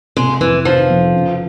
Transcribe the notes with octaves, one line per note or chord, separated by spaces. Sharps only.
C3 G#3
F1 E3
D#3 F3
F2
C#3